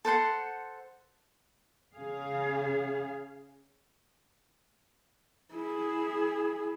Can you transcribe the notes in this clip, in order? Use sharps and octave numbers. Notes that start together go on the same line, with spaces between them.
A4 C5 F#5 C6
C#3 G#4 F5
E4 G#4